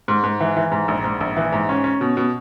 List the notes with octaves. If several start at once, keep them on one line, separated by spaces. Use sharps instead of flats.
G#2
G#2
E3
E3
G#2
A#1
G#2
A#1
E3
G#2
C#4
C#4
B2
B2